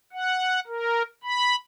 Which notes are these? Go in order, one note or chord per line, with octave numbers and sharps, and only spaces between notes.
F#5
A#4
B5